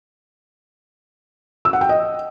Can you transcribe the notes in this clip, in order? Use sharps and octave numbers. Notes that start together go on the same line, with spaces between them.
E6
F#5
G5
D#5